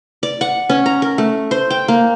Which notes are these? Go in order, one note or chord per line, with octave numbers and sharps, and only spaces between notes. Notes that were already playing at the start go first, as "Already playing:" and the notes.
D5
F#5
C#4
A#5
A#4
A3
C5
G5
A#3